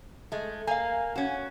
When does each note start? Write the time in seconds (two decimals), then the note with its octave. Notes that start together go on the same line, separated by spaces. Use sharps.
0.32 G#3 A3
0.67 A#3 F5 G#5
1.16 C#4 F#4